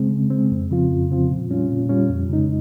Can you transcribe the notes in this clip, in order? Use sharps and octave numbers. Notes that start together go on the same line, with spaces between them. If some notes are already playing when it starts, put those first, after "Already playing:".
Already playing: C#3 G#3 C4
C#3
G#3 C4
F2
C#3 F3 C4 F4
F2
C#3 F3 C4 F4
A#2
G3 C#4 F4
A#2
G3 C#4 F4
F2
C#3 G#3 D#4